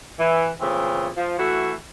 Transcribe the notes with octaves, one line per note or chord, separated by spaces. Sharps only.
E3
A#2 C#3 E3 A3 C4
F3
E3 A3 F#4